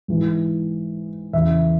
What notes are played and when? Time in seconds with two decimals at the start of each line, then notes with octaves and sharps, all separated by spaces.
0.08 G#2 E3
1.33 E2 C#3 E3 E5